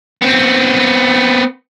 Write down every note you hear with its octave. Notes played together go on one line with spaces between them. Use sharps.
B3 C4